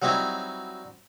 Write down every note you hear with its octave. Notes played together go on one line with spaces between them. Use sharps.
F#3 G3 C4 D#4 E4